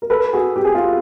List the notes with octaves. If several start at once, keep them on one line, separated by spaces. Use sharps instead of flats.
A#4
A4 B4
F#4 G#4
G4
G#4
F4 G4